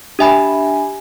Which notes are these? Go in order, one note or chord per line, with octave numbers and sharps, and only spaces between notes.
D4 G4 E5 G#5 B5